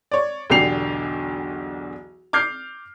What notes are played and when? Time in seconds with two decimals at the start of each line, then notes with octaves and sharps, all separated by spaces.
0.12 C#5 D5
0.50 B1 E2 D3 G4 C7 F7
2.33 D6 F6 G6 C7